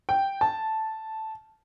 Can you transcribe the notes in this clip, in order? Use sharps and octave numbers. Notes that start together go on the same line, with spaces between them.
G5
A5